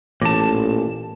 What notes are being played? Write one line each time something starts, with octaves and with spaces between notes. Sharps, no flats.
A1 A#2 E3 A5